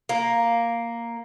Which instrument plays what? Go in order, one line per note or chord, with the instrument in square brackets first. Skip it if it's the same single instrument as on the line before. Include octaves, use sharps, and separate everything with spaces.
[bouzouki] A#3